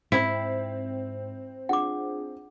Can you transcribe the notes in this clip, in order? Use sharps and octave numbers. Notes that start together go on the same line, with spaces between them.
G#2 C4 E4
D4 F4 G#4 F#5 D6